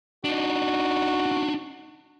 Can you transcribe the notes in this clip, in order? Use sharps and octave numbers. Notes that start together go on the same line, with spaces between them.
D4 D#4 F#4